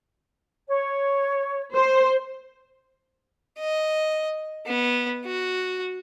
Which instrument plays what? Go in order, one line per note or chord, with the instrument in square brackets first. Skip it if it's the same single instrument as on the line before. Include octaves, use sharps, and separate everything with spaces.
[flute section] C#5
[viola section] C5
[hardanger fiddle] D#5
B3
F#4